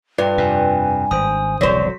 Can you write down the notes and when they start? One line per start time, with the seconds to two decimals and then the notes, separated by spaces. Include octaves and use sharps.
0.18 G2 F4 B4 D5
0.38 F2 C3 G#5
1.11 G#1 C5 D#6
1.61 E1 C2 D3 F#3 C5 D5 B6